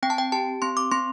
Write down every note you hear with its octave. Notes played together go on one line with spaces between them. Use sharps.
C4 G5
A5
G5
G4 A5
C4 C6
D6
C4 C6